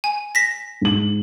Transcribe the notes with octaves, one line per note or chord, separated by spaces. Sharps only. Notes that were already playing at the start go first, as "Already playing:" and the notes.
G#5
A#6 B6
G#2 F#7